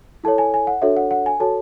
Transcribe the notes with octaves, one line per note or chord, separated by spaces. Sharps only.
E4 A4 C#5 A5
G#5
G#5
F#5
D4 F#4 A4 C#5 E5
F#5
F#5
G#5
F#4 A4 C#5 A5